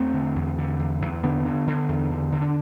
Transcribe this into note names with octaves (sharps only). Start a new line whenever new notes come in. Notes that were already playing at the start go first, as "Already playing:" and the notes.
Already playing: E2 A3 C4
D3
E2
D3
E2
E2
D3 B3 D4
D3
D3
E2
D3
D3
D4